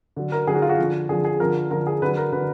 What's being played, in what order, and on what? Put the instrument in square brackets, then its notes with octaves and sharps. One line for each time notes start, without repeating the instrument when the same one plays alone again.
[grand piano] D3 F#3
A#4
D3 F#3 G#4
F#4
F4
F#4
D3 F3
D3 G#4
F3
G#4
D3 F3 A#4
D3 F3 A#4
G#4
D3 B4
F#3
A#4
D3 F#3 B4